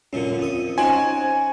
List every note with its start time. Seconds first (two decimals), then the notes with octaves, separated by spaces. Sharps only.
0.13 F#2 A#2 D3 C#4
0.38 F2 D#6
0.78 C#4 D#4 F#4 C5 G#5